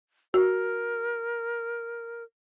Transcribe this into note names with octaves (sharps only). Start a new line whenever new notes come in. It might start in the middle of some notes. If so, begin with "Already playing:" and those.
F#4 A#4